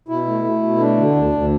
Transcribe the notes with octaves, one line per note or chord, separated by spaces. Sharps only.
B2 E4
A3
A3
B2
A3 D4
D3
D2
D2